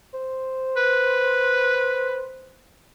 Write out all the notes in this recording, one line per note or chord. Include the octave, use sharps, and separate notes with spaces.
C5
B4